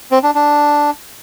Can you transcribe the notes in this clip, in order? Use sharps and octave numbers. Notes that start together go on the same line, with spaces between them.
C4
D4
D4